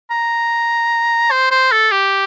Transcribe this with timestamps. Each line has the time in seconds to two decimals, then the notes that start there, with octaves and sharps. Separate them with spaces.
0.11 A#5
1.31 C5
1.51 C5
1.72 A4
1.92 G4